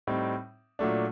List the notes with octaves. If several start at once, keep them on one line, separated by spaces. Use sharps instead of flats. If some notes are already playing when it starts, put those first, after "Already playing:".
A2 G3 C4 D#4
A#2 F#3 A3 D4